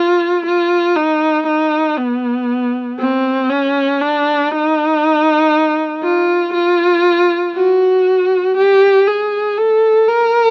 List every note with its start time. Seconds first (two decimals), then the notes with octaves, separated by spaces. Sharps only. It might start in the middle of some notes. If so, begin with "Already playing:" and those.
Already playing: F4
0.46 F4
0.96 D#4
1.47 D#4
1.98 B3
2.99 C4
3.50 C#4
4.01 D4
4.51 D#4
6.03 F4
6.54 F4
7.55 F#4
8.57 G4
9.07 G#4
9.58 A4
10.08 A#4